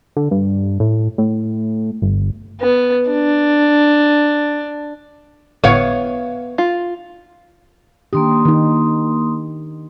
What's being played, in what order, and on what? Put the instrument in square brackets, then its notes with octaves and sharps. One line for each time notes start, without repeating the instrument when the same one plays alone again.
[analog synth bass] D3
G2
A2
A2
G1
[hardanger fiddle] B3
D4
[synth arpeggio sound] G1 A2 C#7 [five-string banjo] B3 [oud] C#5 F5
[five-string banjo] F4
[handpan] D#3 D4 G4 [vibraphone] A#3 C6 D#6
[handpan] D#3 D#4